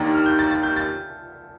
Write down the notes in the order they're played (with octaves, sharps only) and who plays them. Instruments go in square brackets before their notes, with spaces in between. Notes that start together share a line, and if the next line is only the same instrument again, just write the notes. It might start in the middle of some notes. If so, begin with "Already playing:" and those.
Already playing: [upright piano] D#2 D#3 A#3 D4 [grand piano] A#5 A6
[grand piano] F6
G6
A6
A6
G6
A6